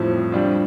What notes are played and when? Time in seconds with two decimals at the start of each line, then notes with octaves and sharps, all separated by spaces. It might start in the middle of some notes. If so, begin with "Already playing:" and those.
Already playing: F2 A2 F3 G3
0.32 G3 D4 F4